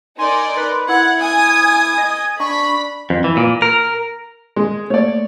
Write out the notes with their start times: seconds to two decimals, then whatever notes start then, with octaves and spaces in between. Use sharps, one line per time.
0.19 D#4 A#4 D5 G#5 C6
0.57 B4
0.89 E4 F#5 G#6
1.21 G#5 D#6
1.98 D#5
2.40 D4 B5 C#6
3.10 F2
3.24 E3
3.37 A#2
3.62 A#4
4.56 G#3
4.90 A3 A#3 C#5 D5